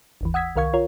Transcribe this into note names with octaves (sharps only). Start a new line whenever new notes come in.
G1 D#2 E3
F#5 D#6 E6 G#6 B6
C2 D#3 A#4 F5 C#6 G#6
F4 A#4 C#5